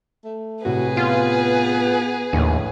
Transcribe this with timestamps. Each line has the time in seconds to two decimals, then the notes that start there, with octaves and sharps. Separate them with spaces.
0.25 A3
0.65 C2 A2 C3 F#4 G#4 B4
0.97 B3 F4
2.33 A#1 D#2 A2